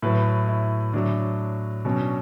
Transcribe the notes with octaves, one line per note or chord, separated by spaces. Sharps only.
A2 F#3 B4
E4
A2 F#3 D4
B2 F#3 C#4
D4